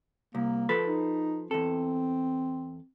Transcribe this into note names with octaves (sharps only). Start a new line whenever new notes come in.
C2 A#3
F3 A4 B4
D#4
E2 C4 A4